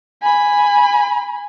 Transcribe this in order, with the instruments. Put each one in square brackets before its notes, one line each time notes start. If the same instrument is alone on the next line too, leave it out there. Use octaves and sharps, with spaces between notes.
[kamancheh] G#5 B5